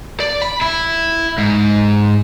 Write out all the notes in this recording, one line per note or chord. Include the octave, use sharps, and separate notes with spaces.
D5
B5
E4
G#2